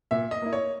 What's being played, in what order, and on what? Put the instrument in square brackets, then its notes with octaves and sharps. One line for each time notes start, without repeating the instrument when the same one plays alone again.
[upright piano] A#2 E5
D#5
A#3 E4
C#5